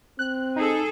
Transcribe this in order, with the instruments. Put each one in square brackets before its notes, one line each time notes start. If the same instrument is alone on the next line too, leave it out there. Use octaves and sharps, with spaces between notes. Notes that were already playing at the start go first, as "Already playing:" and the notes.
[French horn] C4 [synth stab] F#6
[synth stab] D#4 [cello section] G#4 A4